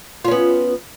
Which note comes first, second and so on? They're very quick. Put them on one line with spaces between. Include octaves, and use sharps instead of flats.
F4 C#4 B3